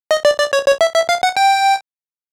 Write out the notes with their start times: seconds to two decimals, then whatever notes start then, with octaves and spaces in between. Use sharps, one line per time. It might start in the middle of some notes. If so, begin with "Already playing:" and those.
0.11 D#5
0.25 D5
0.39 D5
0.53 C#5
0.67 C#5
0.81 E5
0.95 E5
1.09 F5
1.23 F#5
1.37 G5